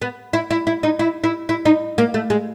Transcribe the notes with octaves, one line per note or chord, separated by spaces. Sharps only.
B3
E4
E4
E4
D#4
E4
E4
E4
D#4
A#3
A3
G#3